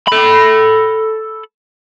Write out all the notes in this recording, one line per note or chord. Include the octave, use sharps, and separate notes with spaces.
A4 B5